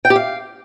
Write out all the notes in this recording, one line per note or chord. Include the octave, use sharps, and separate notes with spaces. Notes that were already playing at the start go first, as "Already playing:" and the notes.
G5
G4
F5